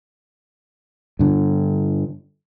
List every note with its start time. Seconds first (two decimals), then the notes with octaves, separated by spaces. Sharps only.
1.19 G2 D3